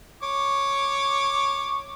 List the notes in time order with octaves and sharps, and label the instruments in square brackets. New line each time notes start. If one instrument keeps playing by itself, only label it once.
[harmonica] C#5 D6